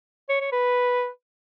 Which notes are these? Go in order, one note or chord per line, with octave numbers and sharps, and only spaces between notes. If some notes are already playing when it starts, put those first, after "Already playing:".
C#5
C#5
B4